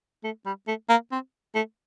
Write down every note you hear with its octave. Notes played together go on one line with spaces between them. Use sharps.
A3
G3
A3
A#3
C4
A3